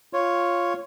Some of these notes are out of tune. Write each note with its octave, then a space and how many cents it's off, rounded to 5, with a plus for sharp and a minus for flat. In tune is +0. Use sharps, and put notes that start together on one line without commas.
F4 +0 C#5 +0